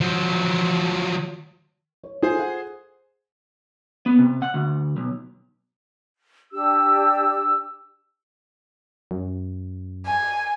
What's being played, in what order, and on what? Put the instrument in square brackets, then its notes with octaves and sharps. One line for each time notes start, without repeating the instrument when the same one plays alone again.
[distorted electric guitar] F3 F#3
[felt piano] C#5
[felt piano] F4 A4 [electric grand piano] G#4 C5 G#5
[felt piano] F#5
[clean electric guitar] B3
C3
F#5
D2
B1
[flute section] D4 G4 E6
[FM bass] F#2
[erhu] G#5